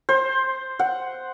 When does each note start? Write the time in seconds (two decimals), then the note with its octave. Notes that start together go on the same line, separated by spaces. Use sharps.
0.09 C5
0.79 F#5